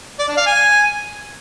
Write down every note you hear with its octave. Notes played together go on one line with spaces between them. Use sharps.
D5
D4
F5
G#5